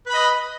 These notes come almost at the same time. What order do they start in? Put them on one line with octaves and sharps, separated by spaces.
B4 B5 D#5